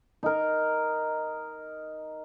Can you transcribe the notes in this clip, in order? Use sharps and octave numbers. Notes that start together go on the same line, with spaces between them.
D#4 A#4